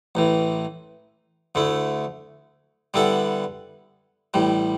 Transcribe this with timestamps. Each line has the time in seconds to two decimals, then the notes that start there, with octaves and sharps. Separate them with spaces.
0.15 A1 A2 E3
1.55 D2 D3 A3 E4
2.94 D3 G3 B3 E4 A4
4.34 A1 A2 G3